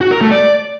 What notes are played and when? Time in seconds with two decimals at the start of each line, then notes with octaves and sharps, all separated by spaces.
0.01 F#4
0.11 A#4
0.21 A3
0.31 D5